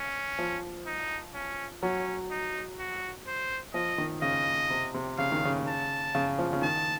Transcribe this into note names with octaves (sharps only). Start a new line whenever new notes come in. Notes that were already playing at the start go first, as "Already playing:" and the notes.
Already playing: C#4
F3
D#4
C#4
F#3 C#4
D#4
F#4
C5
F3 D#5
D#3
C#3 D#5
C3
C3
C#3 F5
D#3
C#3
A5
C#3
F3
C#3
D#3 A5